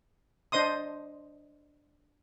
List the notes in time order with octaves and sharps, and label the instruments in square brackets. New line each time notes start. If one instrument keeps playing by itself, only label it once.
[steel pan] D4 C5 D#5 C6 D#6